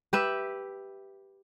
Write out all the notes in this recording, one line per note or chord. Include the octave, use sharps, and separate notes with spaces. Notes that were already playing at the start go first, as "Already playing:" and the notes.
G4 B4 E5